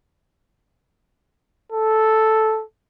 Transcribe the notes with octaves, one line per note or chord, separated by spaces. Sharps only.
A4